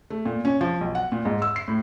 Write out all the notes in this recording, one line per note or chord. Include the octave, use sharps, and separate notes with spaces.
A3
A#2
C#4
F3
B1
F#5
A#2
G#2
E6
C7
A2